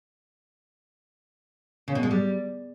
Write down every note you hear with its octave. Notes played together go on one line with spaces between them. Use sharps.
C#3
B2
G#3
G3